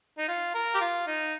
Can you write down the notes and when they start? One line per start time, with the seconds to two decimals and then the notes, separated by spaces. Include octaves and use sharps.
0.18 D#4
0.28 F4
0.55 A#4
0.74 G4
0.81 F4
1.07 D#4